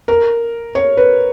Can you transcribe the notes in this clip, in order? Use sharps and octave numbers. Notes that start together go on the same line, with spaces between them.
A#4
C#5
B4